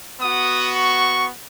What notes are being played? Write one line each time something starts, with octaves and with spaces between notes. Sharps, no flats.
B3 F#4 D#6
C#6